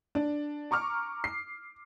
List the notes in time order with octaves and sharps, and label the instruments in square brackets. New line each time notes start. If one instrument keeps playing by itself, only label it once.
[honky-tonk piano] D4
A#5 C#6 D6 F6
C7